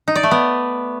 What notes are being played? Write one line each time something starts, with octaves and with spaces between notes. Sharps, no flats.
D#4
D5
A3
B3